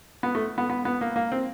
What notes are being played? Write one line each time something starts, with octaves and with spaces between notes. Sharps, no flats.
B3
A3
B3
B3
B3
A#3
A#3
C4